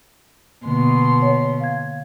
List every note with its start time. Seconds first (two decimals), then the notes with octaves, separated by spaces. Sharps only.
0.65 B2 D3 A#3 C6
1.22 C#5
1.60 F5 G#6